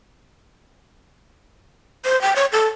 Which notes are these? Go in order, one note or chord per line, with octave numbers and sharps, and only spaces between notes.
C5
G5
C#5
A4